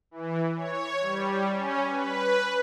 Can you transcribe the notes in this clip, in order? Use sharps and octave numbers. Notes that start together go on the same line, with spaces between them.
E3
C#5
G3
C#4
B4